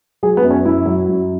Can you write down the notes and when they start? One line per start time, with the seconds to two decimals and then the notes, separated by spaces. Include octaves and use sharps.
0.23 F#3 G#4
0.37 B3
0.43 F#2
0.51 C#4
0.65 F#2 E4
0.86 F#3
1.08 F#2